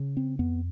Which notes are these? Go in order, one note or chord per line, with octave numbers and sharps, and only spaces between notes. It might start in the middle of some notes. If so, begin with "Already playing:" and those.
Already playing: C#3
C4
F2 B3